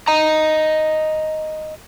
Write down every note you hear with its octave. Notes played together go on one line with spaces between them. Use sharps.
D#5 A#5